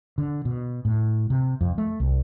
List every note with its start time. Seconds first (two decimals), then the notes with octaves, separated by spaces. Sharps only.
0.18 D3
0.45 B2
0.85 A2
1.30 C3
1.61 F2
1.78 A3
2.00 C2